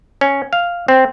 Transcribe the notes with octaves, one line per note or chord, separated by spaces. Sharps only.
C#4
F5
C4